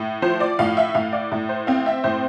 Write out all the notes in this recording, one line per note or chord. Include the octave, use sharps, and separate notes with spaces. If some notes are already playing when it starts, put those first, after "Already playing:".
Already playing: A2
F3 C5
D5
A2 F5
E5
A2 F5
D5
A2
C5
C4 F5
E5
A2 C5